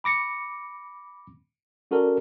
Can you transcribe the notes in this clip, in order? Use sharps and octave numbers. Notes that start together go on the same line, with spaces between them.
B5 D6 A#6 C#7
C#4 F#4 A4 A#4 D5